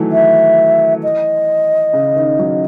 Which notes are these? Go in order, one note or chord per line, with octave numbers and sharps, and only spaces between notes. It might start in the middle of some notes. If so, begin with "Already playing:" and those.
Already playing: D#3 E3 F#3 A3
E5
D#5
C#3
D#3
F#3